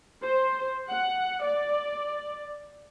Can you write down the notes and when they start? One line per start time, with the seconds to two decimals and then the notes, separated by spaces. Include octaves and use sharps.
0.25 C5
0.90 F#5
1.43 D5